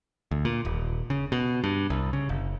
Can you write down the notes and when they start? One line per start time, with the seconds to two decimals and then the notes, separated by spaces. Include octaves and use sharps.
0.31 D2
0.45 A#2
0.65 D#1
1.10 C#3
1.32 B2
1.64 G2
1.90 C2
2.13 C#3
2.29 F#1